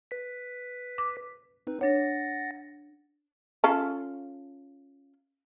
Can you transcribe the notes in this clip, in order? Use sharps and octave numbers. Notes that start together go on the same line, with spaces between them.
B4 B6
D6
C4 D#4 B4
D4 C#5 F#5 A6 A#6
C#4 F4 A4